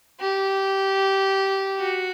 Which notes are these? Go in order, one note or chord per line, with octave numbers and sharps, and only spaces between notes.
G4
F#4